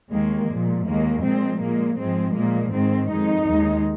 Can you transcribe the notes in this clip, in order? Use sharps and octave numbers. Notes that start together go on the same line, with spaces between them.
D#2 D#3 G#3 A#3
A#2 F3 G#3
D#2 D#3 G#3 A#3
A#2 F3 G#3 C4
A#2 G#3 A#3
G#2 F3 G#3 C4
A#2 F3 G#3 A#3
G#2 D#3 G#3 C4
F2 D#3 G#3 D#4
D#2 D#3 G#3